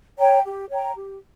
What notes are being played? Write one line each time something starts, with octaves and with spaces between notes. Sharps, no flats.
C#5 G5 A#5
G4
C#5 G5 A#5
G4